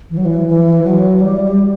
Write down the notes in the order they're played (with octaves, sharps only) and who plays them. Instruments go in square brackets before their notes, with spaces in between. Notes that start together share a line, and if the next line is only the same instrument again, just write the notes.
[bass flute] E3
F#3
E3
E3
F#3
G3
G3